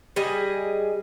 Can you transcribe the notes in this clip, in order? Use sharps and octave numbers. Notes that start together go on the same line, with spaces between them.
G3 G#4 D#5